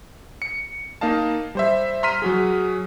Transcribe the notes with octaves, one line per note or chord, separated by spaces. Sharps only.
C#7
A#3 D#4 D#5 F5 A5
G3 C5 E5
A#5 C6 F6 B6 D#7
F#3 F#4 G#4